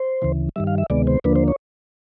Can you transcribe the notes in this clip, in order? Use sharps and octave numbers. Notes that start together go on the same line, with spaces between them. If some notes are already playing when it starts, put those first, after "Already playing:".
Already playing: C5
D2 C#3 E3
G2 D#3 G3 E5
F5
E5
D2 C3 D#3 G#3 B3 D5
C5
D#2 D3 F3 A#3 D4 B4
C5
C#5